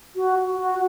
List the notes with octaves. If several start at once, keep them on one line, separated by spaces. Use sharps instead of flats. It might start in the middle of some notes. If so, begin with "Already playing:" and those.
F#4
F#4